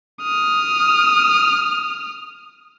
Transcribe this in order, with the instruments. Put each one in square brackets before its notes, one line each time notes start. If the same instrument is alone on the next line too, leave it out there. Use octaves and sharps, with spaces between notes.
[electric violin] D#6 F6